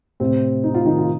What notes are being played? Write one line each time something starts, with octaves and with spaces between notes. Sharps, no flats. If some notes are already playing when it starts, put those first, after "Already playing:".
A2 C3 C4
D#4
F4
D#3 D#4
F4